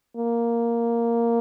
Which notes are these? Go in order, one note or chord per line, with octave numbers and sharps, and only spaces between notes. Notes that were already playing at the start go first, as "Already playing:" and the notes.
A#3